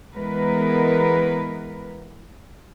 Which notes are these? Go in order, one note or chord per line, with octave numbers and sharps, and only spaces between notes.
E3 G#3 B3 A#4 B4